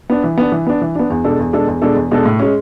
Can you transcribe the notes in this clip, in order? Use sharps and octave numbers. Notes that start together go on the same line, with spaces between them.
B3 D4
E3
B3 D4
E3
B3 D4
E3
B3 D4
E2
B2 G#3 D4 A4
E2
B2 G#3 D4 A4
E2
B2 G#3 D4 A4
E2
B2 G#3 D4 A4
A2
G#3 C#4